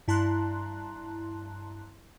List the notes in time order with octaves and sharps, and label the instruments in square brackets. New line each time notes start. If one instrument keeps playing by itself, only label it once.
[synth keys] G2 E4 A5 A#5 C6 F#6